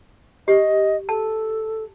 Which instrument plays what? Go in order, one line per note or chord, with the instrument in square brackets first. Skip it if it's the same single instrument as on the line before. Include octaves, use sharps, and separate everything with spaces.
[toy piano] G4 [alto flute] D#5
[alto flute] A4 [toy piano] A5